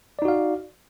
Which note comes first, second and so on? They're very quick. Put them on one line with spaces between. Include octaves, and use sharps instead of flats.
D5 D#4 F#4 F5